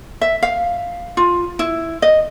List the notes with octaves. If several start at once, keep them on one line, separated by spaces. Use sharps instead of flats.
E5
F5
F4
E4
D#5